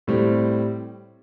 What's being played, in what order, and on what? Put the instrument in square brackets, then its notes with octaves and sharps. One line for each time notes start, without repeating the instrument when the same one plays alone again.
[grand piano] A2 G3 C4